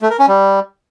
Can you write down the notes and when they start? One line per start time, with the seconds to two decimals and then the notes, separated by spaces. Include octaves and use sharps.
0.02 A3
0.10 A#4
0.19 C#4
0.28 G3